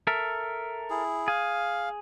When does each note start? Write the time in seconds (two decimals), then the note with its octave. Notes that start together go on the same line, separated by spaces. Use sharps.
0.07 A4 A#4 E5
0.90 E4 G#4
1.28 G#4 F5